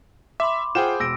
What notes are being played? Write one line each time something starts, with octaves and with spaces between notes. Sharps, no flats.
E5 B5 C6 D6
F4 G#4 C5 F#5 G5 E7
E1 E6 A#6 D7